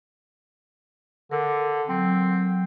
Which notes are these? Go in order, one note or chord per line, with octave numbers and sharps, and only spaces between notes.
D3 A#4
F#3 C4